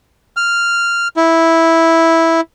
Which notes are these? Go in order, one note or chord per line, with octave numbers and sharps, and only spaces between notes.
F6
E4